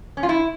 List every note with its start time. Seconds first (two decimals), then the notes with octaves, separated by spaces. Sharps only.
0.17 C#4
0.23 F4
0.29 E4